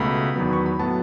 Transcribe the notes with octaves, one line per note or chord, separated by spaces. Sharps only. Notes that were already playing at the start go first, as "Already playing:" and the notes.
Already playing: C#2 B2 A3 B5
E2 D#3 F#3 B3
C#6
B5
A2 F#3 B3 A5